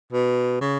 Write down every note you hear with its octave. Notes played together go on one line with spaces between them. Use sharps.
B2
C#3